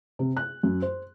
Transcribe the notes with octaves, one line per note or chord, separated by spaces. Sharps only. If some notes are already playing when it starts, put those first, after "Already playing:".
C3
F#6
F#2
C5